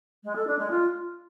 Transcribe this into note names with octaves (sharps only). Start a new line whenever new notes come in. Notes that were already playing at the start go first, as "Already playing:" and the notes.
G#3
A4
D4
G#3
F4